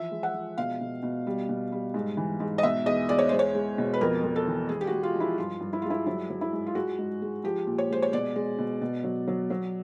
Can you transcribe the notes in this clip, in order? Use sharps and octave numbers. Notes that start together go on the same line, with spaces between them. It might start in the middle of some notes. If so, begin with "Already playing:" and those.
Already playing: E3 F3 E5
G#3
F#5
F3
B2 F5
B2
B2
G3
B2
G3
G#2
E3
G#2
D#5
B2 E5
E2 D#5
E2 D5
C#5
G#3 C5
C#5
G#3
B2
B4
F2 A#4
F2
A4
E3
G#3 G#4
G4
F#4
G#3
F4
F3 E4
G2 F4
G2
E4
G#3 F4
E4
F#3 E4
F#3
E4
G#2
F4
G#3 F#4
G#2
G#3
F3 G4
A#2
C#5
G#3 C5
C#5
B2 D5
G#3
B2
B2
F#3
F#3
F#3